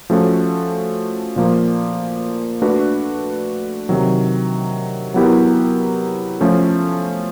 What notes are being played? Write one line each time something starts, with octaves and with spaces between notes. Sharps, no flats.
F3 A3 C#4 F#4 A4
A#2 F3 A#3
A3 D4 F#4 B4
C3 D#3 F#3
F#3 B3 E4 G4 A#4
F3 A3 C#4